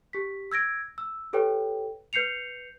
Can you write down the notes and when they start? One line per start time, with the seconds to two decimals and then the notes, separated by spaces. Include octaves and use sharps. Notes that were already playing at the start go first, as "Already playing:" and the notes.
0.13 G4 B6
0.51 E6 G#6 A#6 D7
0.98 E6
1.33 G4 A4 B4 C#5 G5
2.13 B4 G6 C7 C#7 F7